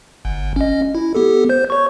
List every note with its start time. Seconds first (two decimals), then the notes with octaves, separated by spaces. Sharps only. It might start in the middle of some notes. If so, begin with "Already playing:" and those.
0.25 G1
0.56 C#4 D#5
0.95 E4
1.15 B3 G4 A4
1.49 C5 G6
1.70 C#5 C#6